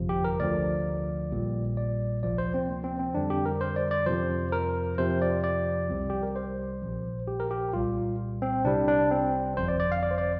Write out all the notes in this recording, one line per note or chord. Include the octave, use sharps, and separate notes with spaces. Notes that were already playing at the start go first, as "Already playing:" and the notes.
Already playing: G1 F2 C3 F3
G4
A#4
D2 D3 F3 D5
A#1 A#2 G3
D5
D2 C3 F3 D5
C5
C4
A#3
C4
C4
F2 D3 G3 D4
G4
A#4
C5
D5
D5
F2 C3 F3 C5
A#4
F2 C3 F3 C5
D5
D5
C2 C3 G3
G4
A#4
C5
A#1 A#2 F3
G4
A#4
G4
C2 A#2 G3 F4
C4
C2 C3 G3 D4
D4
C4
G1 F2 F3 C5
D5
D5
F5
D5
C5
D5